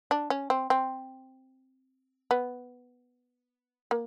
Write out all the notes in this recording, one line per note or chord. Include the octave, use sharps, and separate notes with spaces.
D4
C#4
C4
C4
B3
A#3